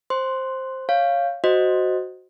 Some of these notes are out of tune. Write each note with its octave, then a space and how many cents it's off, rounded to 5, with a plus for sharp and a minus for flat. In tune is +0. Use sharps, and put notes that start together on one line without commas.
C5 +10 C6 +0
C#5 +0 F5 -5
F#4 +0 C5 +0 D#5 +0